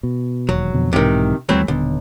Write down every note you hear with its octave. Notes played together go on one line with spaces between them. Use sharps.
B2
E1 D#2 F#3
F2 B2 D3
B1 G#2 C3 D#3 E3
D#2 E3 F#3 G3 A3 C4
D#1 B1 D3 B3